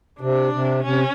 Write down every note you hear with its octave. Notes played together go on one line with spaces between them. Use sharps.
C3 D4
C3
C3 C#4